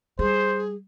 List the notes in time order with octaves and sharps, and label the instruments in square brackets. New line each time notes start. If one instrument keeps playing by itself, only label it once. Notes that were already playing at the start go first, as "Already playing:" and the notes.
[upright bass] G3 [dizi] G#4 [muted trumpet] C5